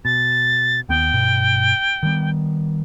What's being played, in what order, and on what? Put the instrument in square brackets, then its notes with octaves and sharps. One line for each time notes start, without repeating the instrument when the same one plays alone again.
[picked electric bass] B2 [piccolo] A6
[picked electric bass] D#2 B3 [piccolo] G5
[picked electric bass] G2 B2
D#3 G3 B3